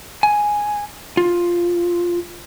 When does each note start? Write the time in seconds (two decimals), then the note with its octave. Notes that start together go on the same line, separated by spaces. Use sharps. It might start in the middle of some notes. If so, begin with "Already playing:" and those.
0.23 G#5
1.17 F4